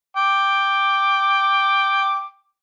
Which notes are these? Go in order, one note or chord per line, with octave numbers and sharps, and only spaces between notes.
G5 D6